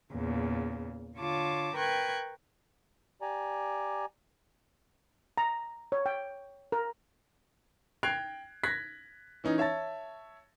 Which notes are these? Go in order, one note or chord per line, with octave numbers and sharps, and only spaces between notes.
E2 A#2 C#3
D3 F4 C#5 A5 D6
A#4 B4 G5 C#6 F#6 G#6
G4 D5 G#5 A#5
A#5
C#5
G5
A#4
G5 F#6 G#6 C7 D7 F7
F#6 G#6 A#6 B6
E3 C#4 D#4
C#5 E5 A5 A6